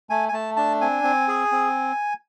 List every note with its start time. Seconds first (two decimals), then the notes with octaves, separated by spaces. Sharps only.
0.10 A3 G#5
0.29 G#5
0.33 A3 A5
0.56 D4 A5
0.81 C4 G#5
1.04 C4
1.28 G#4
1.52 C4